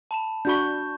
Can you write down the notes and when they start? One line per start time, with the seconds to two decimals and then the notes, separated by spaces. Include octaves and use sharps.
0.11 A5 B5 E7
0.45 D4 F#4 B5 C#6 G6